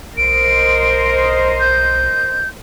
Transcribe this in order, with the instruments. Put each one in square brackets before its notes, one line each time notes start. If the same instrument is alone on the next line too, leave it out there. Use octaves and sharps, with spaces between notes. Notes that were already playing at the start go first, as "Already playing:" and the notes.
[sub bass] B1 [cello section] A#4 C5 D#5 [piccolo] D7
[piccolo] G6